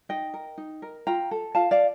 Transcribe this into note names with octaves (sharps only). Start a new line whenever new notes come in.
D#4 D#5 G5
A#4
D#4
A#4
F4 G5 A#5
A4
F4 F5 A5
D5 F5